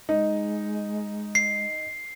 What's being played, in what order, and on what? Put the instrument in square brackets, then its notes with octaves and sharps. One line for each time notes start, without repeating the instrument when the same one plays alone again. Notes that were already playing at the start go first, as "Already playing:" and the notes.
[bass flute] G#3 [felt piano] D#4
[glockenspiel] C7